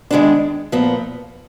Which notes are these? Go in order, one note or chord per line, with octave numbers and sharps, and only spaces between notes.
D#3 G#3 B3 D4
A#2 F3 B3